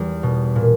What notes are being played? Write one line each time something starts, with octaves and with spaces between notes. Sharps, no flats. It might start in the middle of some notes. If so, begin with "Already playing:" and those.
Already playing: E2 G3
B2
A#2